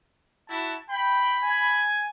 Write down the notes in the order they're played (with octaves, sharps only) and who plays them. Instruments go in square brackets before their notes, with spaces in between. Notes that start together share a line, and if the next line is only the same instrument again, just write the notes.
[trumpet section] E4 F#4 [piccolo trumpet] A5
[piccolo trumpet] G5 [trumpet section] B5
[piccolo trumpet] G#5